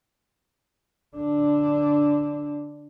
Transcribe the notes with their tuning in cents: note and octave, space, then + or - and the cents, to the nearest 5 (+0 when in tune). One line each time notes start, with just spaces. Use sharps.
D3 -10 D4 +0